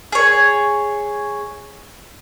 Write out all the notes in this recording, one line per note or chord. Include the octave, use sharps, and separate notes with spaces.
G#4 C#5